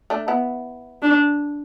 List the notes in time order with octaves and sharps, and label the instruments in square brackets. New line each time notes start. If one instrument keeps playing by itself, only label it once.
[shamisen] A3 D4
B3 E4
[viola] D4